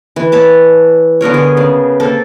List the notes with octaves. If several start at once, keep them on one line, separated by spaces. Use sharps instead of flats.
E3
C#5 A5 B5
D3 B3 A#4 C#5
G#4
C#3
A#3 C4 A4